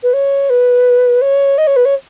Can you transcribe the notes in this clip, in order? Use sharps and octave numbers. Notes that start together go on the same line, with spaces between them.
B4
C#5
B4
C#5
D#5
C#5
B4
C#5